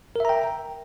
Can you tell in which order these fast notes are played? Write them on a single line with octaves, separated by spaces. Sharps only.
A#4 E5 A#5 G5